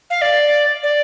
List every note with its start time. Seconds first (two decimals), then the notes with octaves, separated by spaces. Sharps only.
0.10 F5
0.22 D5
0.83 D5